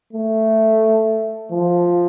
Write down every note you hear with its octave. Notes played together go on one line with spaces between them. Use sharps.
A3
F3